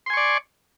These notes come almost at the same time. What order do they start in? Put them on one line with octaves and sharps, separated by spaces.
C6 G#5 C#6 D5